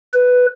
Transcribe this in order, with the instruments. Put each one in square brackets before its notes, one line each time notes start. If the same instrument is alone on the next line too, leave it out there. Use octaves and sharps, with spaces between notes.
[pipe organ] B4